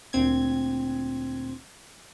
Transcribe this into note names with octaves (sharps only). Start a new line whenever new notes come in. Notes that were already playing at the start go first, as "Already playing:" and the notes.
D2 A#2 C4 G#6